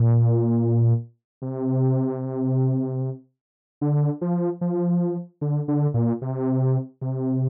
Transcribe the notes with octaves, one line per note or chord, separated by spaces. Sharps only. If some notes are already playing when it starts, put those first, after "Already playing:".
Already playing: A#2
C3
D3
F3
F3
D3
D3
A#2
C3
C3